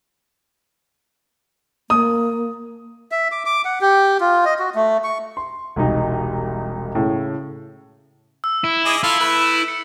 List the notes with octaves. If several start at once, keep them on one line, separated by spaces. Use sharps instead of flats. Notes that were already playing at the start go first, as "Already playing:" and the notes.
A#3 D#6
E5
D6
D6
F#5
G4
F4
D#5
F#4
A3
C#6
C6
E1 C2 D#4
A2 C#3
E6
E4
G#4 D#5 D6
E4 F4 A4 F5
A3 B4
C#7